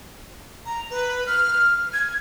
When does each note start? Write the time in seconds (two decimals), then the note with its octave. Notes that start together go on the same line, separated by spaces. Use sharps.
0.66 A#5
0.91 B4
1.26 F6
1.93 G#6